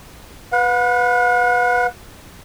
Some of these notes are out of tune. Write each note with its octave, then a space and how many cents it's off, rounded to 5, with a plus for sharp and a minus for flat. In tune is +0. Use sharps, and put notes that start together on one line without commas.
B4 +0 F#5 -45